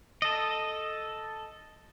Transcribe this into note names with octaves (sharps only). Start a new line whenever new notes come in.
A4 D#5